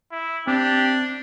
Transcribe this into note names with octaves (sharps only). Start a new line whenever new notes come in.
E4
C4 D4 G4